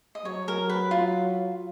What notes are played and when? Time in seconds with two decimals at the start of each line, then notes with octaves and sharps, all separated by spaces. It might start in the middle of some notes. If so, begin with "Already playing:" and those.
0.15 D#5
0.25 F#3 C#5
0.48 A#4
0.69 B4
0.91 F4